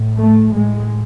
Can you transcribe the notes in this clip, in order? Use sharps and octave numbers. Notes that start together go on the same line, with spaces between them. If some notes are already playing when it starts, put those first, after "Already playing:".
Already playing: A2
A3
A2 G#3